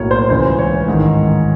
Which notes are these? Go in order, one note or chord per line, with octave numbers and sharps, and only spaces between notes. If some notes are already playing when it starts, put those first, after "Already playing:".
Already playing: B1 A2 F#3 A#3 C#5
C5
C#2 C#3 E3 G#3 C5
C#5
A1 G#2 D#3